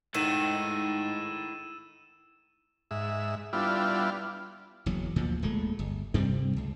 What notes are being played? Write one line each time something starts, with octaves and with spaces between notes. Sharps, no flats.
G#2 D#3 E4 A4 F#5 E6 D#7 E7
G#2 E5
G3 B3 D4 E4 F4
F#1 E2 F#3
D2 A#2 F3
D1 A#2 G#3 A3
G1
G2 C3 G3 C4
C#2